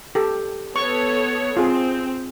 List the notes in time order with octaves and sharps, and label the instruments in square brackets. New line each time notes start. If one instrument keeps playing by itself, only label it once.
[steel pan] G4 A4
[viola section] B3 A4 C#5 [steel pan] C#6
[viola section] C4 [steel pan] F4 G#4